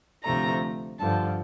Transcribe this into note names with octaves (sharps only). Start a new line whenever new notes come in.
D2 C3 F3 A3 A#5
G2 D3 F3 A5